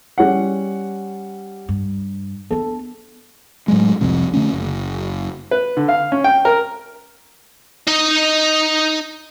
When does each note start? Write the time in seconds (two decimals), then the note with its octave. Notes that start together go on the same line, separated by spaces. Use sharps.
0.18 G3 C#4 F#5
1.69 G2
2.51 B3 D4 A4
3.68 A2 F#3 G#3
4.01 F1 C2 F2 C3
4.33 D3 A3 C#4
4.52 F#1
5.51 B4
5.77 D3
5.88 F5
6.12 C#4
6.24 G5
6.45 A#4
7.87 D#4 D#5